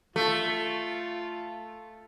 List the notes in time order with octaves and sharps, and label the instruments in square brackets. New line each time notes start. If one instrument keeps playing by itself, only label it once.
[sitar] A3 [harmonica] F4